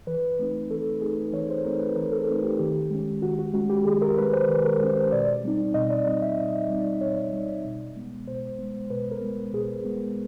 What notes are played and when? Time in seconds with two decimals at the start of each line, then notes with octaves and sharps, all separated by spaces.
0.07 E3 B4
0.39 A3 C4 D#4
0.71 E3 A4
1.01 A3 C4 D#4 G#4
1.33 E3 C#5
1.50 C5
1.65 A3 C4 D#4 A#4
1.80 B4
1.96 E3 A#4
2.12 A4
2.28 A3 C4 D#4
2.43 G4
2.59 D#3 G4
2.90 G#3 C#4
3.22 D#3 F#4
3.39 F#4
3.53 G#3 C#4 F#4
3.70 G4
3.85 D#3 G#4
4.02 A#4
4.17 G#3 C#4 B4
4.33 C5
4.49 D#3 B4
4.65 A#4
4.80 G#3 C#4 C5
4.96 C5
5.12 B2 D5
5.44 G3 C4 D#4
5.74 B2 D#5
5.90 D5
6.06 G3 C4 D#4 D#5
6.22 E5
6.37 B2 D#5
6.70 G3 C4 D#4 D5
7.01 B2 C#5
7.33 G3 C4 D#4
7.65 B2
7.96 G#3 B3
8.27 B2 C5
8.59 G#3 B3
8.90 B2 B4
9.11 A#4
9.21 G#3 B3
9.53 B2 G#4
9.85 G#3 B3